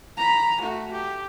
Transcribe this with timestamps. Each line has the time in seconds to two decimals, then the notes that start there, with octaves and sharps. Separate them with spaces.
0.17 A#5 B5
0.61 A3 F#4
0.92 G4